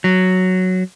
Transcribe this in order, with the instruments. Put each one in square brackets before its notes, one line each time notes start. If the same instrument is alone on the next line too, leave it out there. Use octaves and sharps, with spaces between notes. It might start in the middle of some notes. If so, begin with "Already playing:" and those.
[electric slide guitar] F#3